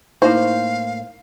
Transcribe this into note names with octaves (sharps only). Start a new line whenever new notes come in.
A2 A#3 D#4 E4 C5 F5